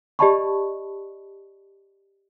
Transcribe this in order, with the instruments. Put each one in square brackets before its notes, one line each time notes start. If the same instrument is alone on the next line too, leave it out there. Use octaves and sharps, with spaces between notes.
[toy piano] G4 D5 D#5 A5 B5 C#6